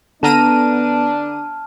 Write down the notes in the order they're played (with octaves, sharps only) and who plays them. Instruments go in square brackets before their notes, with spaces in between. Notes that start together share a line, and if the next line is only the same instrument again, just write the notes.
[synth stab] D3 A#5 D#7 [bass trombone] B3 [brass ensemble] D4 [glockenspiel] A5 F6